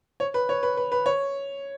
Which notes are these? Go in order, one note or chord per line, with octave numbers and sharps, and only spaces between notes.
C#5
B4
C#5
B4
B4
B4
C#5